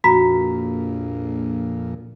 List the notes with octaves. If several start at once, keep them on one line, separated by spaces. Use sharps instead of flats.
A#1 F2 A#2 F#4 A#5 B5 B6